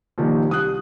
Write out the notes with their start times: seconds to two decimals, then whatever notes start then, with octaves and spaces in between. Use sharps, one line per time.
0.18 A#1 D#3 G3
0.49 C2 D#6 F#6